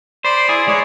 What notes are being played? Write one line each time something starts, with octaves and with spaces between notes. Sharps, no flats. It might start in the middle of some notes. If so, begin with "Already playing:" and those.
C5 D5 B5 C6
E4 G#4 D5
G#3 C#5 D5